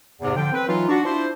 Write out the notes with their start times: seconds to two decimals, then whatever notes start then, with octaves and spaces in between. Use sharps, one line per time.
0.21 E2 G#2 C3
0.35 D3 F3 G5
0.53 C4 B4
0.68 E3 F#3 D#4 F4
0.88 D4 F#4
1.05 D4 E4 F4 C5